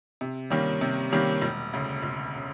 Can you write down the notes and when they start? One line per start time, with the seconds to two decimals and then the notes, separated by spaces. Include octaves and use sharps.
0.21 C3
0.50 D#3 G3 A#3 C#4
0.81 C3
1.12 D#3 G3 A#3 C#4
1.42 E1
1.73 D2 C#3
2.03 E1
2.36 C#3